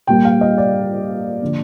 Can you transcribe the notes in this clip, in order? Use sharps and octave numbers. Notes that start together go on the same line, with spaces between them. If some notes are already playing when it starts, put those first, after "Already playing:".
A#2 G3 A#3 G5
F5
D#5
D5
D3 F3 A#3